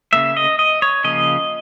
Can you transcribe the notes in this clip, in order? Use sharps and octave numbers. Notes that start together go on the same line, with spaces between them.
C#3 F3 A#3 E5
D#5
D#5
C#5
C#3 F3 A#3 D#5